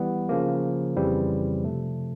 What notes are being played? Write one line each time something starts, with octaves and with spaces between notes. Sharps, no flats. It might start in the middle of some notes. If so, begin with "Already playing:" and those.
Already playing: E3 G3 B3
C#3 F3 A#3
F2 C#3 E3 G3 C4
C3 F3 A3